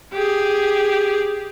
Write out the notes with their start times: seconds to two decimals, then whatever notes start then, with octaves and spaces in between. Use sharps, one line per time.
0.13 G4 G#4